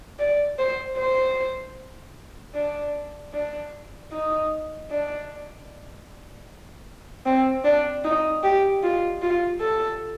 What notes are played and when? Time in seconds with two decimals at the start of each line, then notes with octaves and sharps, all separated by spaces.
0.19 D5
0.59 C5
0.97 C5
2.55 D4
3.33 D4
4.12 D#4
4.90 D4
7.25 C4
7.64 D4
8.04 D#4
8.43 G4
8.83 F4
9.22 F4
9.61 A4